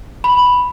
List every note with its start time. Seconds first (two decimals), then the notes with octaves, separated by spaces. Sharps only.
0.24 B5